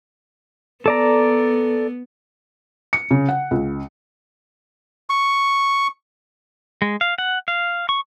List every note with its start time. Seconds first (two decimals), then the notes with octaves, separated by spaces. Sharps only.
0.86 B3 A4 D5 A#5
2.93 C#7
3.11 C#3
3.29 F#5
3.51 C#2
5.10 C#6
6.82 G#3
7.01 F5
7.18 F#5
7.48 F5
7.89 C#6